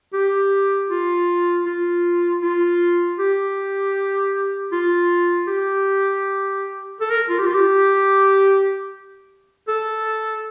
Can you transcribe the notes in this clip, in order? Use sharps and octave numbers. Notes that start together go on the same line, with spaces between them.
G4
F4
F4
F4
G4
F4
G4
A4
A#4
F4
G4
F4
G4
A4